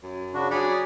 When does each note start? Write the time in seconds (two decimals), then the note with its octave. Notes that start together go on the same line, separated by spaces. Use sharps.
0.03 F#2
0.34 C#3 D4 F#4
0.51 F#3 G#4 D5 B5